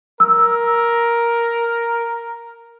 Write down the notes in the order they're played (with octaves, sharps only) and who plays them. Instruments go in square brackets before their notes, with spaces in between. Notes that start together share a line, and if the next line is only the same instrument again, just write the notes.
[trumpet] A#4 [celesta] E6